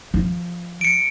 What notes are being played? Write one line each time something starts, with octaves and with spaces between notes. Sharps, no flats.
F3
C#7 D7